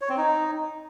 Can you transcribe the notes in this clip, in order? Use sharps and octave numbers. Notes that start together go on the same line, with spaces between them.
C#5
C4
D#4